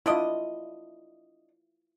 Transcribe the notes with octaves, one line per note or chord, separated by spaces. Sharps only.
D4 E4 F4 D5 D#5